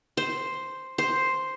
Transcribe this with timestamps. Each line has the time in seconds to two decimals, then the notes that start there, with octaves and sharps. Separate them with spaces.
0.17 C5
0.98 C5